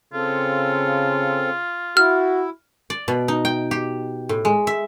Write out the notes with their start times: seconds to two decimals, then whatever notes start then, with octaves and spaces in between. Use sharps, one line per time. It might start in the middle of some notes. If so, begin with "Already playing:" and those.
0.13 C#3 C4 F4 A4
1.97 E4 F#4 F6
2.90 D5
3.08 B2
3.28 D#4
3.45 G5
3.71 G4
4.29 A2
4.45 G#3
4.67 E5